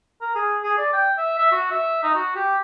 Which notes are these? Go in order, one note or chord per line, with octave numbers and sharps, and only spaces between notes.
A#4
G#4
G#4
D5
G5
E5
E5
F#4
E5
D#4
F#4
G4